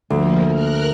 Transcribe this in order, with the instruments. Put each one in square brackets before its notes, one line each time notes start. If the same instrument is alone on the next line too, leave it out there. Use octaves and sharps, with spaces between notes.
[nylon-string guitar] D2 [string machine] F3 A#3
[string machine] A#4 F6 F#6